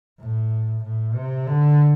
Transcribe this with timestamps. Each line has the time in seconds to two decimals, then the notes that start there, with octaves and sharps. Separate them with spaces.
0.20 A2
0.83 A2
1.15 C3
1.47 D3